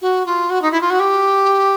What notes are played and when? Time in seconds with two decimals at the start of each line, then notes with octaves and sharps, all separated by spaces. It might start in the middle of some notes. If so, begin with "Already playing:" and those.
0.02 F#4
0.26 F4
0.50 F#4
0.62 D#4
0.72 E4
0.81 F4
0.90 F#4
1.00 G4